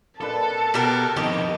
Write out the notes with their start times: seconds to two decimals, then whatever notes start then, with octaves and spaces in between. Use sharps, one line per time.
0.20 A#2 D4 A4 B4 A5
0.74 B2 G4 A#4
1.17 F2 D#3 G4 C#5 D#5